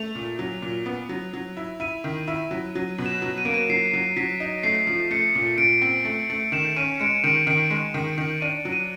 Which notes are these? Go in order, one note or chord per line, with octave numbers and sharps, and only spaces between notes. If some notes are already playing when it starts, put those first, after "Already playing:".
Already playing: A3 F7
A#2
F#3
A#2
B3
F#3
F#3
E4
E4 D#7
D#3
E4
F#3
F#3
B2
E7
F#3
D#7
A#3 D7
D#7
F#3 C7
F#3
F#3 B6
D#4
A3 C7
F3
A3 C#7
A#2
A#2 D7
C4
A3
A3
D#3 E7
C#4 D#7
C#7
G#3 D7
D#3 D7
D#3 D7
G#3
D#3
D#3
D4 D#7
F#3
D#7